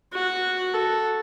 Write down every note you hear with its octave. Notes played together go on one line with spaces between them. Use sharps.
F#4
A4